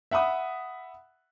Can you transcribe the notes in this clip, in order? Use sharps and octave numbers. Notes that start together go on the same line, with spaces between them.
E5 F#5 B5 D#6